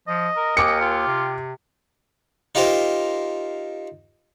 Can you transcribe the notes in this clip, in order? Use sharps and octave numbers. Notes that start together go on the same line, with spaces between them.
F3 D#5
A#4
D#2 A#4 G5 G#5 D6 C#7
F4 G5
C3
D#4 F4 G4 A#4 C5